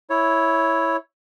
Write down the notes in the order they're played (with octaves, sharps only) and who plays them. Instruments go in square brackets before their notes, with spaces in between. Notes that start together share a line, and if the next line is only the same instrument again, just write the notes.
[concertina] E4 C#5